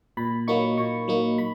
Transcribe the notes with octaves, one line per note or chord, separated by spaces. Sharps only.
A#2 B5
F#3 A#3 D#4 C#6
A#2 C#6
F#3 A#3 D#4
B5